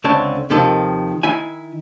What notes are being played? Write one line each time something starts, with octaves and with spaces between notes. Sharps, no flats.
C#2 D3 C4 C#4 A5
D#2 C3 D#3 F3 A4
D#3 E4 G#5